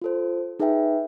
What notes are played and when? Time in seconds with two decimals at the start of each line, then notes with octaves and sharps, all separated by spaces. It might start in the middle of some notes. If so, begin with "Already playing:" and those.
0.02 F4 A4 C5
0.60 D#4 G#4 B4 E5 G5